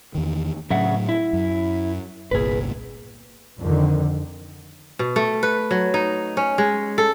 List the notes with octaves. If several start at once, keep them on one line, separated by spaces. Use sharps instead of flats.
E2 D#3
A2 C#3 F#3 E5 F#5
E4
F#2
G1 C2 A#2 G#4 B4
F2 D3 D#3
B2
A3
B4
F#3
D#4
C#4
G#3
A4